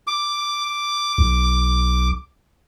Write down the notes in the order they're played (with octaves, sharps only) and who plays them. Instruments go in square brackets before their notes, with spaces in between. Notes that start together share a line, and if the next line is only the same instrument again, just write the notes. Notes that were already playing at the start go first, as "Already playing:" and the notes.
[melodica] D6
[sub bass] B1